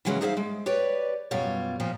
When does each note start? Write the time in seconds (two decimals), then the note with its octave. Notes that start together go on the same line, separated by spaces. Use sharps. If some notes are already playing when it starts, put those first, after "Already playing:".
0.05 C#3 E3 F#3 G#3 C4 C#4
0.21 D#4 G#4 C5 C#5 E5 F5
0.37 G#3
0.66 G4 B4 C#5 D5
1.31 F#2 B2 G3 F4 C#5
1.80 A#2 F3 G3